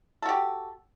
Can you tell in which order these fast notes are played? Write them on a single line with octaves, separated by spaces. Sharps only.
A4 F#4 G4